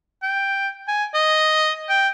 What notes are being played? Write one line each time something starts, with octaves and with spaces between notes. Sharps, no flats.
G5
G#5
D#5
G5